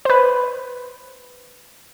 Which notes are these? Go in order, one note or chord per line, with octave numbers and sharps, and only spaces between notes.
B4 C5